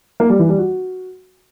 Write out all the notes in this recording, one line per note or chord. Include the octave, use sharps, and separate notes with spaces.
A#3
G3
E3
G3
F#4